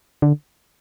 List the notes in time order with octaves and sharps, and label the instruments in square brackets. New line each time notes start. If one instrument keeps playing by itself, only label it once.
[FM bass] D3